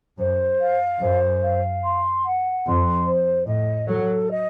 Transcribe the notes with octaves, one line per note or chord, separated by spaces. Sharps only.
F#2 C5
F5
F#2 C5
F5
C6
F#5
F2 C6
C5
A2 D#5
F#3 A4
D#5